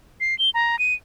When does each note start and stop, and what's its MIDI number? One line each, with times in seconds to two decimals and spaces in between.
0.21 0.37 96
0.39 0.50 103
0.54 0.79 82
0.79 0.94 99